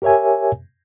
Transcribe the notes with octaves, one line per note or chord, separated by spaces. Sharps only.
G4 A#4 C#5 E5 G#5